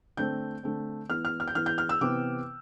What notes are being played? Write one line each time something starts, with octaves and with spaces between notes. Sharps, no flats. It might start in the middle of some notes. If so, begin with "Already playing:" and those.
D3 A3 C4 G6
D3 A3 C4
E3 B3 F6
F6
F6
G6
E3 B3 F6
G6
F6
E6
C3 E3 B3 D6